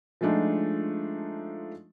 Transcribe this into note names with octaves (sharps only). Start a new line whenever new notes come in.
F3 G#3 A3 D4 D#4 F4